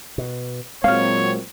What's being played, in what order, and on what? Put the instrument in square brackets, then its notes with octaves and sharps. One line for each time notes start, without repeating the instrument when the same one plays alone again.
[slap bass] B2
[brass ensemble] A#2 F#3 C4 [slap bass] G#3 [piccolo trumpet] C#5 [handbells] F5 F6